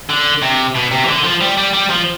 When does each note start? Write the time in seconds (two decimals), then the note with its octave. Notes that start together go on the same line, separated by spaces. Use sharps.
0.10 D3
0.42 C3
0.75 B2
0.92 C3
1.04 E3
1.08 D3
1.24 F3
1.41 G3
1.57 G3
1.73 G3
1.90 F3